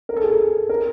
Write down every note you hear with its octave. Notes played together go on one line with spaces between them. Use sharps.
A#4
A4
G#4
A4
A#4